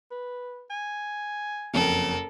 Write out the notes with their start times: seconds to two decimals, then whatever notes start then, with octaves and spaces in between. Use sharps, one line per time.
0.11 B4
0.71 G#5
1.74 F#1 F2 A4 A#4